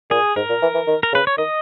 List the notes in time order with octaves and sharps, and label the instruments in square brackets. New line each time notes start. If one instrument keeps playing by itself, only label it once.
[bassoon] A#2 [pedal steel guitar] G#4
[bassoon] G#2 [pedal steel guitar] A#4
[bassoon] A#2
E3
E3
D#3
[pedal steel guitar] A#4
[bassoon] C#3
[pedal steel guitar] B4
C#5
[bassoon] D#3 [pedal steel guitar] D#5